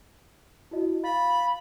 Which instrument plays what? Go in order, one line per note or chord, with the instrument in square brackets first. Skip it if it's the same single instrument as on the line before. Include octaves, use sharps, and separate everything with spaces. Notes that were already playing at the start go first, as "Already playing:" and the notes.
[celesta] E4 F#4 D#5
[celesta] F5 A6 [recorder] B5